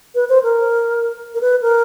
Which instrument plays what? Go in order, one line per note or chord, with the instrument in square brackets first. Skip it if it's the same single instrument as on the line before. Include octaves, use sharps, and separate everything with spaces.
[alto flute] B4
C5
A#4
A#4
B4
A#4